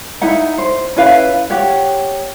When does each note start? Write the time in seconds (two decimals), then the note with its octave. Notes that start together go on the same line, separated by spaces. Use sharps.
0.21 D#4 E4 F#5 A#5
0.58 C5
0.96 C#4 E4 B4 F5
1.50 G4 C#5 F#5